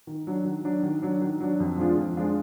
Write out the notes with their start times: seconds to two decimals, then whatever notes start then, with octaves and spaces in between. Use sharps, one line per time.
0.07 D#3
0.27 F#3 D4
0.45 D#3
0.64 F#3 D4
0.83 D#3
1.02 F#3 D4
1.21 D#3
1.41 F#3 D4
1.60 F2
1.78 F3 G#3 D4 F4
1.97 F2
2.17 F3 G#3 D4 F4